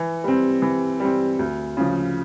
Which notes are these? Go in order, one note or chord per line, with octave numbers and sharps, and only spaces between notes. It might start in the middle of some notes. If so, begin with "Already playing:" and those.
Already playing: E3
G3 C4
E3
G3 C4
D2
C#3 F3